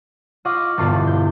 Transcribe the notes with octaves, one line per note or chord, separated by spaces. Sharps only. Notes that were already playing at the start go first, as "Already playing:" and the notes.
F4 D#5 F#5 C#6 D6 F6
E1 E2 G2 D3 F4 A6
G6